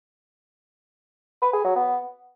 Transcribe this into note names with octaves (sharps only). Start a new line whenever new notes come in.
B4
G#4
F#3
B3